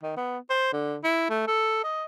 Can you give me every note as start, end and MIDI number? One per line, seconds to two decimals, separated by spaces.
0.03 0.13 51
0.17 0.38 59
0.50 0.72 72
0.73 0.96 50
1.04 1.26 64
1.30 1.44 57
1.47 1.83 69
1.84 2.04 75